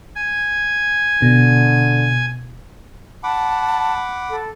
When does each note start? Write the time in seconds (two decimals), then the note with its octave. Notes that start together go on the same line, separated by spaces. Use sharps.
0.16 G#5
1.22 B2 D3
3.24 F#5 A5 B5 D6
4.30 A4